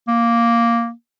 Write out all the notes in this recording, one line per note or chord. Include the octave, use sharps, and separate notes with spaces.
A#3